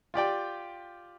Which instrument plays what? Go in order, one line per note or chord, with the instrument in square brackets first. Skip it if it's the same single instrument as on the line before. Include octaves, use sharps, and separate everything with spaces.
[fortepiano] F4 G4 D5 G5